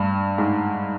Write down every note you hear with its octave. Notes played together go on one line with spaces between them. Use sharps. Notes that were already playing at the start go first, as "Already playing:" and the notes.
Already playing: G2
G#2